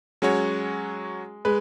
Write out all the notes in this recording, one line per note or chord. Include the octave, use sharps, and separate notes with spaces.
F#3 G#3 C#4 F#4 C#5
G#3 B4